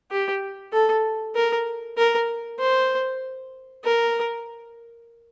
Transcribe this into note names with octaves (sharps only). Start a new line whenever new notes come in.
G4
A4
A#4
A#4
C5
A#4